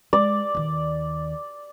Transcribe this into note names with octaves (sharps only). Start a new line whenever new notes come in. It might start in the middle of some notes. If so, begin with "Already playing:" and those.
G#3 D5
D#2 D#3